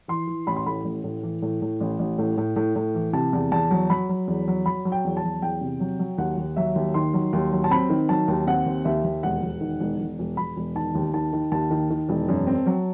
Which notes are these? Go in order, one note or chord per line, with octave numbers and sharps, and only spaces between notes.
E3 C6
E3
A1 B5
C6
A2 B5
A1
A2
E3
A2
A2
A1
A1
A2
A2
A2
A2
E3
C3 A5
E2
E2 A5
F#3
F#3 B5
F#3
E2
F#3
F#3 B5
F#3
G5
E2
A5
F#3
E2 G5
C3
F#3
F#3
D#2 F#5
D#2
F#3 E5
D#2
D#3 C6
F#3
D#2
F#3
A5
C4 B5
D#3
F#3 A5
D#2
C4 F#5
D#2
D#2 E5
D#2
E1 F#5
E1
D#3
E1
E1
E1
E1 B5
E1
D#3 A5
D#2
D#3 A5
D#3
D#2 A5
D#3
D#3
E1
F#2
C4
F#3